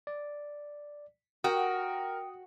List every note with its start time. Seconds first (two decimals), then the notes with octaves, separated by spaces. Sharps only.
0.07 D5
1.44 F#4 A#4 G5 D#6